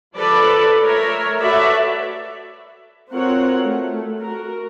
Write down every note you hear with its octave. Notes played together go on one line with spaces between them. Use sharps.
F3 A4 B4 D5
A3 A#4 C#5 E5
F#4 A4 B4 C#5 D5 E5
C4 F4 F#4 A#4 C#5 F#5
A3
F#4 A#4